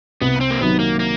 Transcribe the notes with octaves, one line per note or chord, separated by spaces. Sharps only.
C2 B3
C4
A#3
C3 D#3 F#3 B3
A#3
A#3